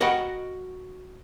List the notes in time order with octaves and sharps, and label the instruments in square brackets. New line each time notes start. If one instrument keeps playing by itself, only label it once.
[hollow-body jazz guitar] F#4 A#4 D#5 F#5 G5 B5